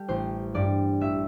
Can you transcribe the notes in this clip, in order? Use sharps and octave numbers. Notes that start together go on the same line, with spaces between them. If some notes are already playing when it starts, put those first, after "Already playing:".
Already playing: G3 G4 A4
A1 C5
G2 G3 D5
A1 E5